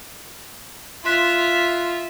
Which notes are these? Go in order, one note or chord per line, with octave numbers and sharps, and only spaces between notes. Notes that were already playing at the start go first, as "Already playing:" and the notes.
F4 E5 C6 F#6 B6